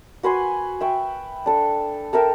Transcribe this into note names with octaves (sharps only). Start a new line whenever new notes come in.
F#4 B4 G#5 C6
E5 G5 C#6
D4 A4
A4 A#4 E5 G5